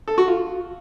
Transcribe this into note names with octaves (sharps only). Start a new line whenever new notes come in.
A4
F#4
F4